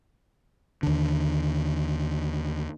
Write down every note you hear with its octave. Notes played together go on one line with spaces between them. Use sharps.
D#2 D3